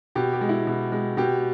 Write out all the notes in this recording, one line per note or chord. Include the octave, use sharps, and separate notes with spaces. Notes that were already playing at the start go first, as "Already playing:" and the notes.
B2 G4
G4
G#3
E4
B2
G#3
B2 G4